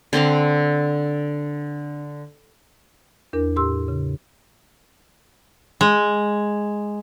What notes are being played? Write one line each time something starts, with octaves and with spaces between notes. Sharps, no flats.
D3 C4 D4 F5
E2 D4 A#4
A2 G4 C6 E6
C#3
G#3